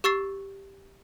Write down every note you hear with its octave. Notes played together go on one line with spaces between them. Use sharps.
G4 C#6 E6 A6 C7